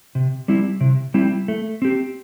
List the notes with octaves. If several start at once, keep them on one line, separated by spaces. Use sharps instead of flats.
C3
G3 C4 E4
C3
G3 C4 E4
A3
C4 G4